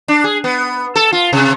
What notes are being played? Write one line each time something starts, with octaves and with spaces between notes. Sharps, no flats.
D4
G#4
B3
A4
F4
C3